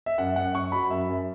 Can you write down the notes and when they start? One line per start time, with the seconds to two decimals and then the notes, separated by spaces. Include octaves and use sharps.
0.06 E5
0.18 F#2 F#5
0.36 F#2 F#5
0.54 F#2 C#6
0.72 F#3 B5
0.90 F#2 E5
1.08 F#2